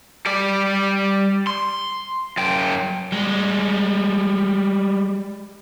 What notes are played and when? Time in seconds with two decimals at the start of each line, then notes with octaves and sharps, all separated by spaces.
0.26 G3 D5
1.47 C6
2.37 F#2 G5
3.12 G3 G#3